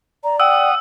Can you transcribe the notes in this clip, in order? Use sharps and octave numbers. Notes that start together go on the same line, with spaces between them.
D5 A#5
F#5 G5 D#6 E6